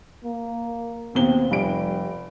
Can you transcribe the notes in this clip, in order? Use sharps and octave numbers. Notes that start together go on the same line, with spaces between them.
A#3
D#2 B2 C4 G7
F1 G3 D7